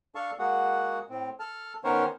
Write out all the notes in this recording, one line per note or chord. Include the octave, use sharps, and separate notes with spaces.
D4 A4 F5 A5 C#6
G#3 A#3 F#4 G#4 F#5
A2 C4
A4 A5 F6
D#3 B3 C#4 A#4 C5 C#5